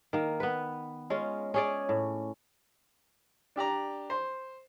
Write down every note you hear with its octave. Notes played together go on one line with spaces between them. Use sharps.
D#3 A#3
B3 B4
G#3 C#4 F4
C#4 G#4 D5
A2
D4 G4 D5 A#5
C5